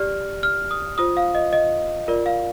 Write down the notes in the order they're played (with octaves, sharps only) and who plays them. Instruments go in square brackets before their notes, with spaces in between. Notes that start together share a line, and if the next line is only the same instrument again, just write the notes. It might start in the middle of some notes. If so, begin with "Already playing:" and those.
Already playing: [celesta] G4 D5 F6
F6
D#6
F4 C5 D#6
F5
D#5
D#5
F4 A#4 D5
F5